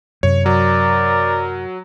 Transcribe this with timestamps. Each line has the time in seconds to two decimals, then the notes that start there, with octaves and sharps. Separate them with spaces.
0.23 F#2 C3 C#5
0.46 F#3 A#4 D5